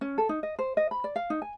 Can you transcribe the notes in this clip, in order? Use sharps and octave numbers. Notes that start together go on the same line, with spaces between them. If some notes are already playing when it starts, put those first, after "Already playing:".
C#4
A4
D#4
D#5
C5
D#5
B5
D5
F5
D#4
G#5